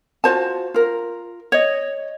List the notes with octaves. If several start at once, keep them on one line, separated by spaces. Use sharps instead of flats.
F4 F#4 C5 A5
F4 A#4
C#5 D#5